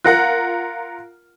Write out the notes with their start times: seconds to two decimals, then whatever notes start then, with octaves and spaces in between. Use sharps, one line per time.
0.04 F4 A#4 F#5 F#6 A#6